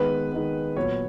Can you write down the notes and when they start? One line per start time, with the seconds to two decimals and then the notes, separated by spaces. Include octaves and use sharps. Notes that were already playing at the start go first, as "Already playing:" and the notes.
Already playing: D#3 G#3 B3 B4
0.32 D#3 G#3 B3
0.77 A#2 F#3 B3 C#5